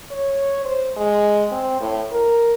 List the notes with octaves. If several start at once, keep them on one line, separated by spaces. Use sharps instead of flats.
C#5
C5
G#3
C4
A2
A#4